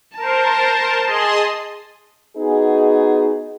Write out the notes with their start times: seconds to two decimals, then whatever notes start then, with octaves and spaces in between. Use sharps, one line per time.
0.17 A#4 C5 A5
1.05 G#4 D#5 C6
2.37 B3 D#4 F#4 G#4